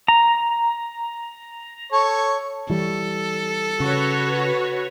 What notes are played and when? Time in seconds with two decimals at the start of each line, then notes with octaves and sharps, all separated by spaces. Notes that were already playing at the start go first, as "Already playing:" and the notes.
0.08 A#5
1.93 A4 C#5 C#6
2.70 E3 G3 A4
3.80 C#3 F#4 B4 C#5